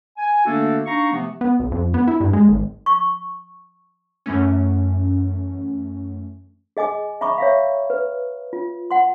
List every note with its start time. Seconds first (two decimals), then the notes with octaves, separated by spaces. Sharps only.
0.17 G#5
0.45 D3 A3 A#3 D4 F#4 A4
0.86 D4 D#4 F5 A#5 C#6
1.10 C3 E3 F3 A3 B3
1.41 B3
1.60 B1
1.72 F2
1.94 B3
2.07 E4
2.20 G2
2.33 G#3
2.48 G#1
2.86 C#6
4.26 F#2 E3 A3 C#4
6.77 G#4 D#5 G#5 D6
7.21 E5 A#5 B5 C#6 D6
7.38 C#5 E5 F5
7.90 B4
8.53 F4
8.91 F#5 C6